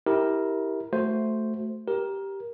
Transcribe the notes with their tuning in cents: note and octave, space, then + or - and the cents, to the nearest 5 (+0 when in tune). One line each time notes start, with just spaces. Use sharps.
E4 -25 G4 +0 A#4 +0
A3 +0 F#4 +0 C5 +0
G4 +0 A#4 +15